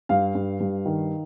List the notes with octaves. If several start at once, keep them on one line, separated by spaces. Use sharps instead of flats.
G2 F5
G2
G2
D#3